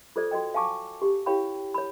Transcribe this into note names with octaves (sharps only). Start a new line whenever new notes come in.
F4 G#4 A4 C5 D5
F#4 A4 D#5 G5
F5 G#5 A5 C#6 D6
G4
E4 G4 C#5 F5 G5 B5
C#5 B5